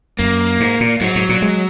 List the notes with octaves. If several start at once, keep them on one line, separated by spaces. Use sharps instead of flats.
F#2 A#3
G#2
A#2
G#2 F#3
G#2
A#2
G#3